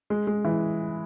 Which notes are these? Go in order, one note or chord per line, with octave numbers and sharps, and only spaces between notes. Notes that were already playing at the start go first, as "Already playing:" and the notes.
G#3
G#3
E3